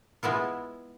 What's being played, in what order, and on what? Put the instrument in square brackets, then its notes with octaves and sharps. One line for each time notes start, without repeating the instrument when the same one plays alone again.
[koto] G#3 B3 E4 F4